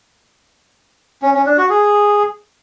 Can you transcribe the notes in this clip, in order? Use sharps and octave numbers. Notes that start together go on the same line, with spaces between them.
C#4
C#4
D4
F#4
G#4